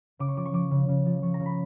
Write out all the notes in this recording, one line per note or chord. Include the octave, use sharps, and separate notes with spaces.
C#3 D6
C#6
F3 D6
C#6
F3 D6
C#3
C#3
F3
F3 C#6
A#5
C#3
B5